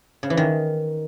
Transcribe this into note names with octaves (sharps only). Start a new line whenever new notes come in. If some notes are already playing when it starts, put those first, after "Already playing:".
C#3
E3
D#3